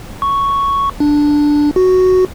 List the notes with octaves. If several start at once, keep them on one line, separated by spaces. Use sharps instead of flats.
C#6
D4
F#4